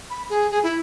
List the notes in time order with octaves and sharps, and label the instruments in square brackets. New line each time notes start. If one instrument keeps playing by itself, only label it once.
[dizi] B5
G#4
G#4
E4